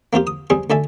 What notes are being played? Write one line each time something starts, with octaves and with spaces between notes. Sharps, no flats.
A#3 C4 F4 G4
D#6
G3 C4 G#4
D2 A4 D5 E5 G#5